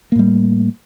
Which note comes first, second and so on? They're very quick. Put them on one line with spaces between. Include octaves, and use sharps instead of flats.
A#3 A2 G3